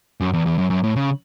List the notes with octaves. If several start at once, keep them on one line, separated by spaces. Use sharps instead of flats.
F#2
E2
E2
F#2
F#2
A2
C#3